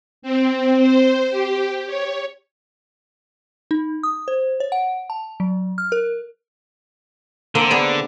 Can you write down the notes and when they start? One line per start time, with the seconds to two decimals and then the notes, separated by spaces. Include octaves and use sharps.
0.22 C4
0.78 C5
1.30 G4
1.87 C#5
3.71 D#4
4.03 D#6
4.28 C5
4.60 C#5
4.72 F#5
5.10 A5
5.40 F#3
5.78 F6
5.92 A#4
7.55 D3 A#3 C4
7.71 B3 G#4 D5